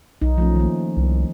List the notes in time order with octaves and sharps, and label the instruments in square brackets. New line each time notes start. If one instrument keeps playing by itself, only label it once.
[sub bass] B1 [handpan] D#4
[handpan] F3 A3 C#4
D#3 A#3
[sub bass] C2